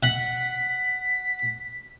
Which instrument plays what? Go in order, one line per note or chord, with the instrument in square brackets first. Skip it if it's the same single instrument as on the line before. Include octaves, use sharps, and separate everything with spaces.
[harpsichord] F#5 [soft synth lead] B6